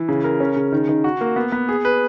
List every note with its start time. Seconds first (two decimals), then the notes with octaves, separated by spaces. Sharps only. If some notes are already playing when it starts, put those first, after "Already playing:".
Already playing: E3
0.09 C#3
0.24 A#4
0.40 C#4
0.56 C#3
0.72 D#3
0.89 D#3
1.04 F#4
1.21 A#3
1.36 B3
1.52 B3
1.69 G#4
1.85 B4